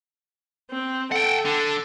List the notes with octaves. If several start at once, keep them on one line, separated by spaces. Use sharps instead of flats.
C4
A4 F#5 G5
D3